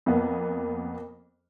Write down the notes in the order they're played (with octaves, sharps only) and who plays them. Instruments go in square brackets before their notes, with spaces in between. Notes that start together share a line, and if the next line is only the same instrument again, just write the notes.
[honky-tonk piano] F2 A#3 B3